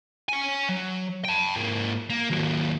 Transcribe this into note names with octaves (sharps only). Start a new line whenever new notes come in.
C#5 G#5
F#3
G5 A5
G#2 A#3
A#3
D#2 F#3